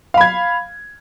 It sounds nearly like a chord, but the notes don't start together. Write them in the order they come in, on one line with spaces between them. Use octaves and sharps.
F5 B5 G#6